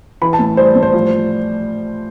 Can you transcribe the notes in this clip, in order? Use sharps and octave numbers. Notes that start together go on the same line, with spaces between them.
E3 B5
A5
A2
G3 C5
A2
C5
F3